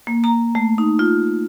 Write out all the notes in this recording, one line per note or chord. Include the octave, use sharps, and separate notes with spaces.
A#3
A#5
A3
D#4
F4